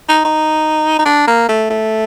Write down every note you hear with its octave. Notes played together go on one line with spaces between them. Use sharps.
D#4
D#4
D#4
D4
A#3
A3
A3